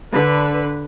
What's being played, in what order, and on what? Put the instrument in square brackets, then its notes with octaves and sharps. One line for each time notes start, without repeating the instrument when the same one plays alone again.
[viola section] D3 B4